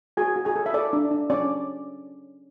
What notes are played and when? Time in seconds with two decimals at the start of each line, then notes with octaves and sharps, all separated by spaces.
0.17 F#4 G#4 G#5
0.36 F#4
0.45 G#4 G#5
0.56 A4
0.66 E5
0.74 A4 D5
0.93 D4
1.11 D4
1.30 C#4 D5